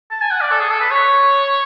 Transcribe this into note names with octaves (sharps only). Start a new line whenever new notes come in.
A5
G#5
F#5
D5
A4
G#4
A4
B4
C#5